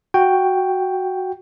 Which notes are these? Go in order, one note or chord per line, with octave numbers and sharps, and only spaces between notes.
F#4 G5